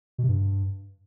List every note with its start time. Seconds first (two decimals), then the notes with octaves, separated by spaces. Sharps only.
0.18 B2
0.24 C3
0.29 G2